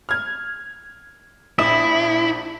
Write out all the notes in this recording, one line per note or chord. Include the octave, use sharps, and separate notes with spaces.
F6 G#6
A#1 E4 D#6 E7